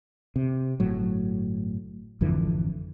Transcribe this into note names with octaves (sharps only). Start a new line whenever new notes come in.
C3
G1 A2 F#3
G#1 F2 D3 E3